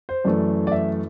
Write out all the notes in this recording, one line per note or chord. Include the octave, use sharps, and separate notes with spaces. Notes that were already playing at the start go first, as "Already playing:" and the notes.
C5
F#2 E3 A3 D5
D5
E5